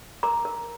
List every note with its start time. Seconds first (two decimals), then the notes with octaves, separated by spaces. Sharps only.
0.23 A#4 A#5 D6
0.45 A#4